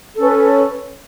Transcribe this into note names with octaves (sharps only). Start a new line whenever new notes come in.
C#4 A4 B4